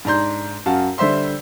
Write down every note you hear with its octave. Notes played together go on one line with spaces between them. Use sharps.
G#2 D4 A#5 C6 G6
F#2 F#4 F5 A5
D3 G3 C5 E5 C6